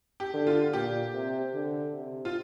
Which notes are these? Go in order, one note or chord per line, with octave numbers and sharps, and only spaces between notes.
G4
D3
F4
A#2 G4
C3
D3
C3
F4